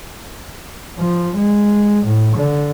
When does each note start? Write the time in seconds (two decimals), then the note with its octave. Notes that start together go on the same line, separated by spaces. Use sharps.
0.99 F3
1.36 G#3
2.06 A2
2.37 D3